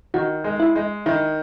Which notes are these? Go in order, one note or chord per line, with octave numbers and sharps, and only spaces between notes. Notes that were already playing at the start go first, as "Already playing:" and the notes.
D#3 F#4
G#3
E4
G#3
D#3 E4